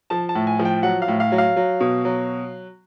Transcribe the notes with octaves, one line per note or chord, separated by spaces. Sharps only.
F3 A5
A5
A2
G#5
F3
G5
F#3 F#5
F5
A2
F5
F#3
F5
F#3
B2
F#3